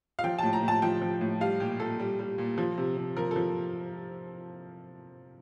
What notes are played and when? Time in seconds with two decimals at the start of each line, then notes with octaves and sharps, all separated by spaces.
0.19 F5
0.24 F3 G5
0.39 A2 A5
0.53 A#5
0.63 A2 A5
0.82 F3 G5
1.02 F3
1.21 A2
1.41 G3 F5
1.60 A#2 G4
1.80 A#2 A4
2.00 G3
2.19 G3
2.38 A#2
2.58 F3
2.78 C3
2.97 C3
3.17 F3 A#4
3.31 F3 A4